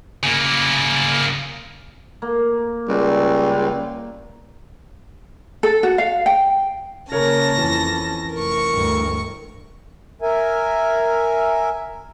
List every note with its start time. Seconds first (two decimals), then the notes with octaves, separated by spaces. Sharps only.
0.23 C#3 A#3
2.22 A#3
2.89 C#2 G3
5.63 A4
5.83 F#4
5.98 F5
6.26 G5
7.12 C#3 A#3 C#4 A#4 C#5 A5 A#6
7.57 F2 E3
8.34 F1 A#4 C#6
8.71 D2 G2
10.22 A#4 E5 G#5